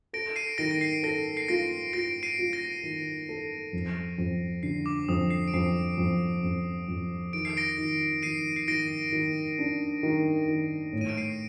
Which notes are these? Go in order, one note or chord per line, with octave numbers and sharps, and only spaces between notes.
A4 A#6 D7
C7 D#7
D#3 A#6 D7
A#6
C7
A4 A#6
C7
F4 A#6 D7
F4 A#6 D7
C7 D#7
F4
A#6 D7
D#3
A4
F2
F2
D3 C7
D6
F2 D#6
C7
D7
F2 C7
F2
F2
F2
D#3 D7
C7
A#6 D7
D#3
D#3 C7 D#7
C7
D#3 A#6 D7
D#3
D4
D#3
D#3
A2
D#7
D7
C7 D#7